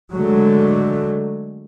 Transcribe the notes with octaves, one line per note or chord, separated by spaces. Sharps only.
D3 F#3 G#3 A3